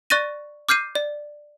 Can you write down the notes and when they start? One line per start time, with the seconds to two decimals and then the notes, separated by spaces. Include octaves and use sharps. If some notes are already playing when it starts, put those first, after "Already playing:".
0.10 D5 C#6 F#6 A6 A#6 D#7
0.69 D6 F6 G6 C7 D#7
0.95 D5